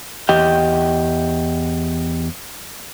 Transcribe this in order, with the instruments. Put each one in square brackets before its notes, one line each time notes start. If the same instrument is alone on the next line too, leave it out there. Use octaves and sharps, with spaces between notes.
[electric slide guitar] E2 G4 D#5 G5